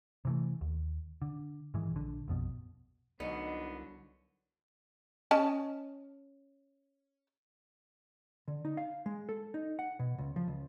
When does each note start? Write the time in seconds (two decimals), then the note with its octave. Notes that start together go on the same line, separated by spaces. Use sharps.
0.25 C3 E3 A3
0.61 D#2
1.22 D3
1.74 G#2 D#3 E3 G#3
1.92 A#1 D3
2.28 A#1 F2 B2
3.20 C2 D3 F#3 B3 D#4
5.31 C#4 D#5 A5
8.48 D3
8.65 D#4
8.77 F5
9.06 G#3
9.29 A4
9.54 D#4
9.79 F#5
9.99 B2
10.18 C#2
10.36 F3
10.48 C#2